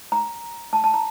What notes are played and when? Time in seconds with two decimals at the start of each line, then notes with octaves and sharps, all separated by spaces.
0.12 A#5
0.73 A5
0.84 A5
0.94 A#5